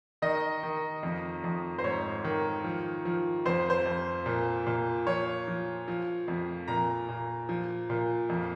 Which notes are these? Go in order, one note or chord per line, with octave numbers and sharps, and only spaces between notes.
D#3 D#5
D#3
F2
F2
C5
G#2 C#5
D#3
F3
F3
F2 C5
C5
F2
A#2
A#2
F3 C#5
F3
F3
F2
A#2 A#5
A#2
F3
A#2
F2